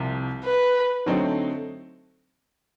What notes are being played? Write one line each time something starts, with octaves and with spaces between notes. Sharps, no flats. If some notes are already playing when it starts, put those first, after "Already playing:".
Already playing: C2 C3 F3
B4
D3 F#3 A3 C4 D#4